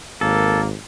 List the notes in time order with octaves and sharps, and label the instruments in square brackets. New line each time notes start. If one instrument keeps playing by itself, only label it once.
[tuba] G#1 [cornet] A#3 [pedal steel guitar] A4